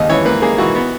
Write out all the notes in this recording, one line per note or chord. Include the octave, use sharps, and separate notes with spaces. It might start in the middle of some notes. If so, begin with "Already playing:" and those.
Already playing: D#2 C#3 D#5
E3 C#5
A#3 B4
A#3 G#4
E3 F#4
B3